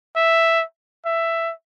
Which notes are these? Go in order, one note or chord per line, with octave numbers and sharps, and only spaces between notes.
E5
E5